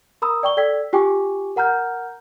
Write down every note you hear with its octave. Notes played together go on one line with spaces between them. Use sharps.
A#4 A#5 B5 D#6 E6
D5 G5 C#6 G7
A4 D5 G5 E6 G#6 B6
F4 G4 G5 G#5 C#6 D6
A#4 F#5 A#5 F6 G6